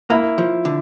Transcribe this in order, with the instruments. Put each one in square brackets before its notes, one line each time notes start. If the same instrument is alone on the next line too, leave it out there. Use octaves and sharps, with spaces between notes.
[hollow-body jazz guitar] A#3 [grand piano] E4
[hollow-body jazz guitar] F3
D3